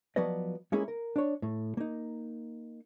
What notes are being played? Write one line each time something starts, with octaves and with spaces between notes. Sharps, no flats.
F3 F#3 B3 B4 D5 D#5
G#3 A#3 C#4 E4 G#4
A#4
D4 C#5
A2
A#3 D#4